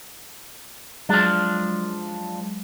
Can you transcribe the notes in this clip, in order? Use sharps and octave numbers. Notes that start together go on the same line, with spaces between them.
F3 F#3 G#3 D4